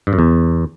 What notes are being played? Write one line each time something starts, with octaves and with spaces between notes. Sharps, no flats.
G2
F#2
E2